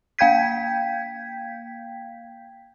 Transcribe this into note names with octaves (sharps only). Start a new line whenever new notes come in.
A#3 F5 G5 G6 G#6 B6